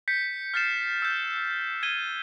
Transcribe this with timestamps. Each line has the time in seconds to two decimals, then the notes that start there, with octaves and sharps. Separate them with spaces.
0.08 G6 B6 C#7
0.54 F6 G6 A6 C7 E7
1.02 E6 G6
1.83 G#6 D#7 G7